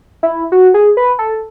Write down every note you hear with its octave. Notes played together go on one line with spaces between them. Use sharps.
E4
F#4
G#4
B4
A4